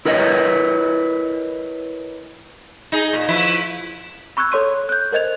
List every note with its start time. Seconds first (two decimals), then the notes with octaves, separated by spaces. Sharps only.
0.05 E4 A#4 B4 C#5 D#5
2.92 D#4 G#4
3.13 A#2
3.28 F3 E4 B4
4.37 B5 C#6 E6 F#6 G#6
4.52 A4 C#5 C6 D#7
4.89 F#6 G6
5.12 A#4 C5 D#5 G#6 F7